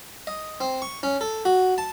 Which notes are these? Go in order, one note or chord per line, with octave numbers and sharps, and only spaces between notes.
D#5
C4
C#6
C#4
A4
F#4
A5